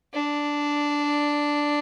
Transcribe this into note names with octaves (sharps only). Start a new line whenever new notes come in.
D4